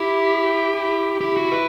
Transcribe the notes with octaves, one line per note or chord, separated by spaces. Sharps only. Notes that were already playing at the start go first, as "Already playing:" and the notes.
Already playing: E4 G4
E4
E4 G4
F#4
B4